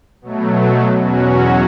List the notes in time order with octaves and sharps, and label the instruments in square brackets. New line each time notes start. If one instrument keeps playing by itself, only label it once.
[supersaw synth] B2 F#3 A3
E2 B2 F#3 C#4 F#4